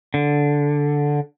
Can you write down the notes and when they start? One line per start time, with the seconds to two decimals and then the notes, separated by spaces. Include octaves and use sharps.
0.14 D3